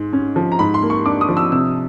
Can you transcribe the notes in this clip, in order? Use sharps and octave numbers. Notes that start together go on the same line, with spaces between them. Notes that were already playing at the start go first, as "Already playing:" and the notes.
Already playing: G#2 G#3
C#4
F3
A#5
G#2 B5
C6
A#3
C#6
D4 D6
D#6
F3
E6
C3 E6